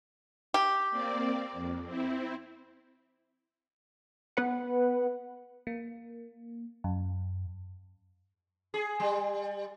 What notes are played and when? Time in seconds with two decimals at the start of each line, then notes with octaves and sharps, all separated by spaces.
0.54 G4
0.91 A#3 C4 D5
1.53 F2
1.85 C4 E4
4.37 B3 B4 F#5
5.67 A#3
6.84 F#2
8.74 G#4
9.00 G3